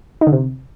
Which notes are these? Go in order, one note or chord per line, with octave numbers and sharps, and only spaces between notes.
D#4
D3
C3